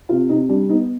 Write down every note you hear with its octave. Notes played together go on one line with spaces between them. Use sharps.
C3 F4
C3 D#4
G3 D4
B3 D#4